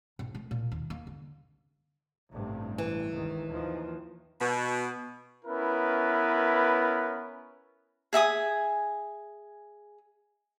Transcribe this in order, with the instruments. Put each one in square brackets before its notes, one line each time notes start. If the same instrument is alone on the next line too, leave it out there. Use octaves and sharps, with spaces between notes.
[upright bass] A#1
A3
A#2
D#2
A#3
D3
[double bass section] A1 G2 C3
[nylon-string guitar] E3
[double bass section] G1 C#2 D#3
D#2 D#3 F3
[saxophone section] B2
[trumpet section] B3 C#4 E4 A#4 B4
[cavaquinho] G#4 E5 G#5 D#6